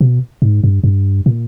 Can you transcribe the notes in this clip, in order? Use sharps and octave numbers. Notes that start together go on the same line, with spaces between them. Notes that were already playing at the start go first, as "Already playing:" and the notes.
B2
G#2
G2
G2
A#2